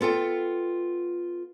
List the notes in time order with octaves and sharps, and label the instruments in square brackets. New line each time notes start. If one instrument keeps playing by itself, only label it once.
[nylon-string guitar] B3 F4 A4 G5